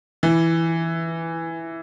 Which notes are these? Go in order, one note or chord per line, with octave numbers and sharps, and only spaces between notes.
E3